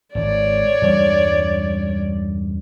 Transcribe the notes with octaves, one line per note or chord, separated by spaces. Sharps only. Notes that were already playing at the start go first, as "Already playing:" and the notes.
G#1 C#5 D5
E2 G2 G3